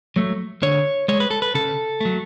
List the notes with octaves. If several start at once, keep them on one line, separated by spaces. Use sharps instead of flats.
F#3 A3
D3 C#5
G#3 C#5
B4
A4
B4
C#3 A4
F#3 A3